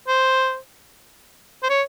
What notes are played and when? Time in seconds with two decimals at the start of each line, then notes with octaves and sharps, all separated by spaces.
0.07 C5
1.63 C5
1.69 C#5